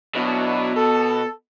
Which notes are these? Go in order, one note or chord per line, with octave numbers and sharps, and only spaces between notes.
B2 F#3 D4 E4
A4